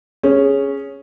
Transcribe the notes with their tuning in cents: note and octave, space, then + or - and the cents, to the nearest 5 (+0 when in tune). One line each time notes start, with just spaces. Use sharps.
C#4 +0 G#4 +0